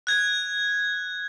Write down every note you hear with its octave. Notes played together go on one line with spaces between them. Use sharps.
F#6 G#6